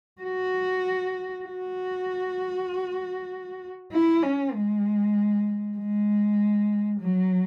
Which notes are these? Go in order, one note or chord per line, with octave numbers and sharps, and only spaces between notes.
F#4
F#4
E4
C#4
G#3
G#3
F#3